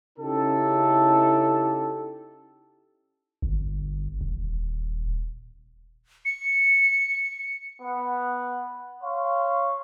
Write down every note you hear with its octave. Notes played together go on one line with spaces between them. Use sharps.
C#3 C#4 D#4 E4 G4 A4
G1
D#1
C#7
B3 F#5
C#5 F5 C6 C#6